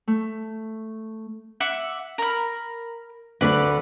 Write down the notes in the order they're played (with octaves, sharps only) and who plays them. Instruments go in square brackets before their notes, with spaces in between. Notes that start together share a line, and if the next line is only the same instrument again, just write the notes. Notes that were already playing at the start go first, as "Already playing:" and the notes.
[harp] A3
[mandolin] E5 F#5 D6
A#4 B5
[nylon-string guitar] D2 D3 [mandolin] B4 D5 B5